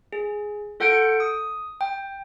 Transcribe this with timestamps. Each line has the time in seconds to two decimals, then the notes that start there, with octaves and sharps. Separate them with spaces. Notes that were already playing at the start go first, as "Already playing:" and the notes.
0.13 G#4
0.80 F4 A4 F#5 G6 C#7 D7
1.20 D#6
1.81 G5